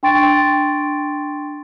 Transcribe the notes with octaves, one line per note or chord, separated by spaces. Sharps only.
D4 G5 C6 C#6 A6 D7